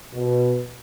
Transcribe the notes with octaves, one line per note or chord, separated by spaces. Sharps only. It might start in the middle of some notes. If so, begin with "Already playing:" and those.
B2